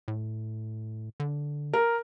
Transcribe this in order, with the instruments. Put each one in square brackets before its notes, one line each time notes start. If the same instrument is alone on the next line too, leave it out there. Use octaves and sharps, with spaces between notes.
[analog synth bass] A2
D3
[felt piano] A#4